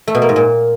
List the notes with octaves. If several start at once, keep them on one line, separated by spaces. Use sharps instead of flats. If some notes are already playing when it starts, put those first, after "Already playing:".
A3
B2
A#3
G#2
A#2